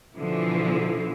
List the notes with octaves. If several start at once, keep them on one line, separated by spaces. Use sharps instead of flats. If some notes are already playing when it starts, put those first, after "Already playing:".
B2 D3 E3 F3 E4